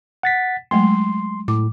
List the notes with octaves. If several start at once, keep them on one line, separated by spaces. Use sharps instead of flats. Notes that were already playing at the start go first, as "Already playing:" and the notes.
F#5 A6 B6
F#3 G#3 A3 C6
A2 D6